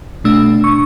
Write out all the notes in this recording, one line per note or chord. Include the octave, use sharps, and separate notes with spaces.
B2 A3 D4 E6
C#6